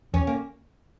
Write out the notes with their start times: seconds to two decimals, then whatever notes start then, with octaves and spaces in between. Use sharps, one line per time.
0.13 E2 C#4
0.27 A#3